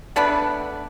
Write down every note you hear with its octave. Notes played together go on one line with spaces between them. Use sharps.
A3 B3 D4 B4